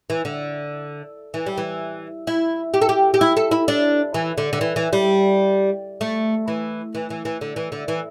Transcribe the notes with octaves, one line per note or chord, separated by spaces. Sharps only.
E3
D3
E3
G3
E3
E4
G4
A4
G4
G4
E4
A4
E4
D4
E3
D3
D3
E3
E3
G3
A3
E3
E3
E3
E3
D3
E3
D3
E3